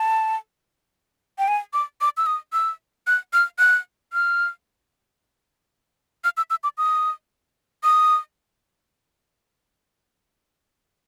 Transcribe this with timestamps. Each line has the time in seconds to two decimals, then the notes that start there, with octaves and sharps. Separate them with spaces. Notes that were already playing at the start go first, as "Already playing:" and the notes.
Already playing: A5
1.38 G5
1.48 G#5
1.73 D6
2.01 D6
2.17 E6
2.26 D#6
2.53 E6
3.07 F#6
3.33 F6
3.59 F#6
4.13 F6
6.24 F6
6.37 E6
6.50 E6
6.64 D6
6.78 D#6
7.84 D#6